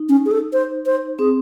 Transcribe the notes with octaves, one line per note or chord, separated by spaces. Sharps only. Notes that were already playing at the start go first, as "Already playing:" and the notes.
Already playing: D#4
C#4
G#4
A4
C5
C5
C4 G#4